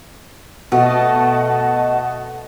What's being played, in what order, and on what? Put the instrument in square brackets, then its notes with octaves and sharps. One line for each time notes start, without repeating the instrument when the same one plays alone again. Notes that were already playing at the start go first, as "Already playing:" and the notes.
[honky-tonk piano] B2 [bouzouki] A3 [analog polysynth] D#5 A5 [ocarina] F#5